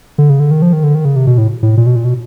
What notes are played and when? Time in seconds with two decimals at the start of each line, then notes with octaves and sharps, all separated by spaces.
0.18 D3
0.30 C#3
0.40 D3
0.51 D#3
0.62 F3
0.73 D#3
0.84 D3
0.95 D#3
1.05 C#3
1.16 C3
1.27 B2
1.38 A2
1.63 A2
1.77 A#2
1.86 B2
1.96 A#2
2.05 B2